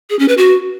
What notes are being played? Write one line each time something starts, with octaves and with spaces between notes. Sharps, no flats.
G#4
C#4
B4
F#4